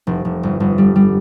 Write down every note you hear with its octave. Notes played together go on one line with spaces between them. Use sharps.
F1
F1
G1
G1
G3
G3